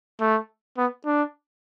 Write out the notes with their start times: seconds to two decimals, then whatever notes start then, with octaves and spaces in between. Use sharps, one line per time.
0.21 A3
0.77 B3
1.06 D4